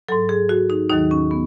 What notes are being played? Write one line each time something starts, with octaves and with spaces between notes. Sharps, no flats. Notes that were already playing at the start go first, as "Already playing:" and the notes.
G#2 F#3 A4
G#4
F#4
D#4
D#2 D#3 F#3 D#4
C#4
B3